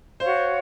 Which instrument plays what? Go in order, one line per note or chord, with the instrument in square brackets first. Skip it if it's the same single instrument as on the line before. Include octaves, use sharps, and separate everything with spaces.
[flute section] F#4 C#5 F5 [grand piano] C5